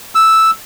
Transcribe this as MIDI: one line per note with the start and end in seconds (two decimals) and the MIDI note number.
0.15 0.51 88